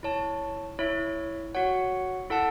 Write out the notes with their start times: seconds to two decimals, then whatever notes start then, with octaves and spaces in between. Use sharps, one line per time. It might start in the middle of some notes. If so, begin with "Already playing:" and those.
0.03 E4 C#5 A5
0.79 E4 C#5 E5
1.55 F#4 C#5 F#5
2.30 E4 A4 F#5 A5